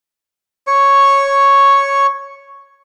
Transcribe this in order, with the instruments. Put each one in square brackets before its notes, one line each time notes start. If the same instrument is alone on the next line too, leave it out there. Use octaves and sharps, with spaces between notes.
[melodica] C#5 C#6